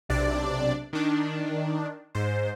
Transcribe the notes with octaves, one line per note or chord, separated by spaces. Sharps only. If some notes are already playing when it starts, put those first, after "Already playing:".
B1 C3 D4 D5
D#3 D4
G#2 C5